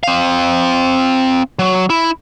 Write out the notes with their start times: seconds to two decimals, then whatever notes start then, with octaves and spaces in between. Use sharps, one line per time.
0.03 C4 F5
1.59 F#3
1.90 E4